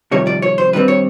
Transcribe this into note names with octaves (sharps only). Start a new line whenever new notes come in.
F2 C3 D#3 G3 C#5
D5
C#5
C5
G2 D#3 G3 C4 B4
C#5